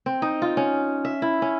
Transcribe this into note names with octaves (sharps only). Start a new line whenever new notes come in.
C4
D#4
F4
C#4
E5
E4
C#4